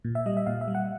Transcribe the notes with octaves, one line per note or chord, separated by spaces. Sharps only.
A#2
E5
G3 D#5
E5
A#2 F5
E5
G3
F#5